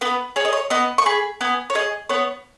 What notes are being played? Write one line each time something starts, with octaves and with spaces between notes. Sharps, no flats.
B3 B4
G#4 C#5
D#5
C#5
B3 D#5
C#6
G#4 B5
B3 G#5
C#5
G#4 D#5
B3 C#5